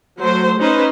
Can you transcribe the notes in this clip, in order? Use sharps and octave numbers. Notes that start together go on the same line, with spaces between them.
F#3 A3 C5
C#4 D#4 B4 C5